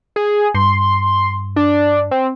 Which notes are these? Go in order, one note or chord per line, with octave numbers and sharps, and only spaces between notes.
G#4
G2 C6
D4
C4